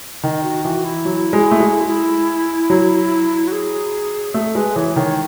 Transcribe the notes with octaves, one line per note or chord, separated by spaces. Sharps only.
D#3 D#5
F#4
E3 F#4
E4
F#3
G#3
A3
G#3
E4
F#3
F#4
G#4
A3 A4
G#3 B4
E3 C#5
D#3 C#5